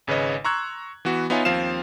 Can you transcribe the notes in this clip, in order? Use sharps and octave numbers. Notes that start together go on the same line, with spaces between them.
G#1 C#3 B4 C#5 D#5
A#5 C6 C#6 E6 F#6 G#6
E3 B3 F#4
B3 D#4 F4 C#5 E5 G#5
D#2 F3 C4 F5 E7